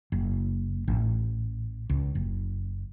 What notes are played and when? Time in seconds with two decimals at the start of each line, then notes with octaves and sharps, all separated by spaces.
0.12 F#1
0.88 A1
1.90 C#2
2.15 F#1